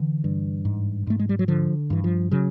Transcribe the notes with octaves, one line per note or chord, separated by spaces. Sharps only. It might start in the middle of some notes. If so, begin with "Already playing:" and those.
Already playing: D3 E3
G2
G#2
G#2 A3
G#3
G3
F#3
D3 F3
G2 E3
F3
C#3 F#3